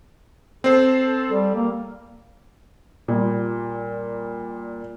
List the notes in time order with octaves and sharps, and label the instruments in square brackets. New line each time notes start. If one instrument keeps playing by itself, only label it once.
[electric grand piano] C4 C5 [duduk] A4
[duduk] G3
A#3
[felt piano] A#2 G3